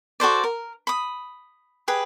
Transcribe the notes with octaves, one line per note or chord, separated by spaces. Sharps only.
F#4 A4 C5 D5
A#4
B5 D#6
G4 G#4 B4